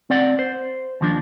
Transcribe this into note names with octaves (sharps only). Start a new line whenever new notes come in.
C4 D5 F#5
C5
D#2 F3 D4